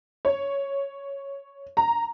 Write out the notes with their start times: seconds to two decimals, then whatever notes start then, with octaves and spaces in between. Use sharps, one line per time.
0.25 C#5
1.77 A#5